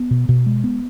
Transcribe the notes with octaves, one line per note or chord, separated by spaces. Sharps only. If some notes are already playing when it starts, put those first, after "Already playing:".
Already playing: B3
B2
B2
G#3
B3